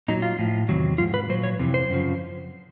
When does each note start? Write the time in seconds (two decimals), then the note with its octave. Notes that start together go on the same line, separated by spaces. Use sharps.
0.08 A#2 F#3 D#4
0.22 F4
0.39 A2 F3
0.69 E2 C3 D#3 F#3
0.98 G#2 F3 F4
1.14 B4
1.29 A#2 F#3 C5
1.43 C#5
1.59 F2 C3 E3
1.74 C5
1.89 F#2 C#3 F3